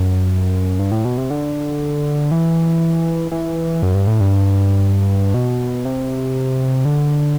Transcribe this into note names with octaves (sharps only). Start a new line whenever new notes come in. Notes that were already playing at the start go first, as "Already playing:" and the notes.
Already playing: F#2
G2
A2
B2
C3
D3
E3
E3
F#2
G2
A2
G2
B2
C3
D3